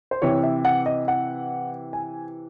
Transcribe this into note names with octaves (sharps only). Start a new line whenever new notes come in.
C5
C3 E3 C#5
E5
F#5
D#5
F#5
G#5